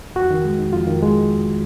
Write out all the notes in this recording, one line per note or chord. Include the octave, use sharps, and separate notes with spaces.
F2 F#4
D#3
G#3
D#4
F2 F4
D#3
G#3